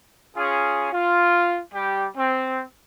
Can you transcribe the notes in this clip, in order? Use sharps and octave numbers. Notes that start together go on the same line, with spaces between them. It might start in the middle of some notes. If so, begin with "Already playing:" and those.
C#4 F4 G#4
F4
G3 G4
C4